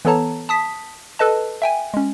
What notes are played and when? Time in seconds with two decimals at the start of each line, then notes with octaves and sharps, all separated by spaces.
0.05 E3 B3 A4 C#5 A5 A#5
0.49 A5 D#6 B6
1.19 A4 B4 D#5 A5
1.62 E5 G5 G#5
1.94 G#3 C#4